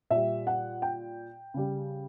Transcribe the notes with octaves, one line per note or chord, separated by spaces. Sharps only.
A#2 G3 E5
F#5
G5
C#3 G3